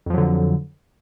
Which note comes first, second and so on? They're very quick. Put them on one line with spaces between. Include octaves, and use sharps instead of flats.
F2 F3 F#3 D3